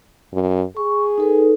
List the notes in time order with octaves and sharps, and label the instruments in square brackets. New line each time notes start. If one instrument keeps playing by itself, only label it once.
[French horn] F#2
[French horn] G#4 [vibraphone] C#6
[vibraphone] D#4 A4 B4